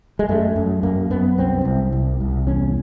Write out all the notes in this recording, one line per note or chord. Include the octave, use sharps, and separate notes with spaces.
G#3
F#2 A3
F#2
F#2 A#3
F#2 B3
C2 C4
C2
C2
C2
E2 C#4